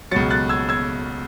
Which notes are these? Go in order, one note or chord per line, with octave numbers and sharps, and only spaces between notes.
C#2 B2 F#3 A6 C#7
F#6 A6
E6 G#6
E6 G#6